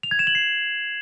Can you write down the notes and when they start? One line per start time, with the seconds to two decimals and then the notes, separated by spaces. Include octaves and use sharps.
0.03 F7
0.11 G#6
0.19 E7
0.27 F#7
0.35 C7